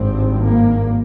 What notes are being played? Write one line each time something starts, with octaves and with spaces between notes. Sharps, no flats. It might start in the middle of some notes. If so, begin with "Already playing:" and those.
Already playing: G#1 G2 C4
A#3